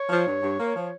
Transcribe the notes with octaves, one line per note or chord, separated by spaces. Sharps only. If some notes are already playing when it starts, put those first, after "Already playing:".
Already playing: C#5
F3
G2
G2
A#3
F3